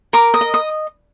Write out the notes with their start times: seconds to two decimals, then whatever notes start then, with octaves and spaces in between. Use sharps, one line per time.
0.13 A#4 D6
0.34 D#6
0.41 D#5
0.54 D#6